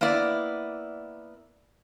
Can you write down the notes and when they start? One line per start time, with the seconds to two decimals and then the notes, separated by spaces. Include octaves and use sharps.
0.01 A#3 B3 E4 D5